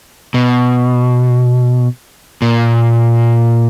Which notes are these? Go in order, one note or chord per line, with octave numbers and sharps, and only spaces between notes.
B2
A#2